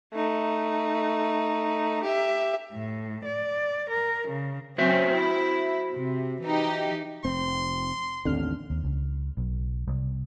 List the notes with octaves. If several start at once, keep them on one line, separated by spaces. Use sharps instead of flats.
A3 D#4
G4 E5
A2
D5
A#4
C#3
F#3 C4 C#4 F#4 C5 E5
E4
C3
E3 D#4 G4
F1 C4 C6
A1 D#2 D3 C4 D4 F6
D#2
C#2
B1
C2